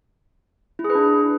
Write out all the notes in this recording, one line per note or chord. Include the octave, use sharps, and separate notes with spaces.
E4
G#4
B4
D4